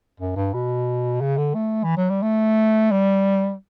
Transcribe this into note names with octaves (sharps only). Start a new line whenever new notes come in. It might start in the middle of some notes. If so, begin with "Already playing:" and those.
F#2
G2
B2
C#3
D3
A3
E3
F#3
G3
A3
G3